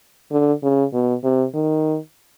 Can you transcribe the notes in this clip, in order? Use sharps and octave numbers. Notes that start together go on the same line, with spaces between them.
D3
C#3
B2
C3
D#3